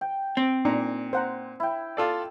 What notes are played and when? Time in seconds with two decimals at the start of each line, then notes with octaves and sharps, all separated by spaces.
0.01 G5
0.37 C4
0.65 A#2 D4 D#4 A#5
1.13 C5 F#5 A#5
1.60 E4 G5
1.97 F4 A4 D5